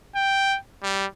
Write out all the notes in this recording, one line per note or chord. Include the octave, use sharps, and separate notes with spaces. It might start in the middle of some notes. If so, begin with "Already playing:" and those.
G5
G3